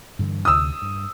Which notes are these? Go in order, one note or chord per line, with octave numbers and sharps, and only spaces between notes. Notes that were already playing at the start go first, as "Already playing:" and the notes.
G2 D3 E3
D2 C3 D#6 E6
G2